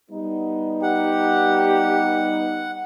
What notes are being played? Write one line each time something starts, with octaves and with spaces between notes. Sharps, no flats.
G3 B3 D#4
G4 F#5